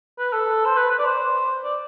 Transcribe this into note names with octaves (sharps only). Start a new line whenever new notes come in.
B4
A4
C5
B4
B4
D5
C5
D5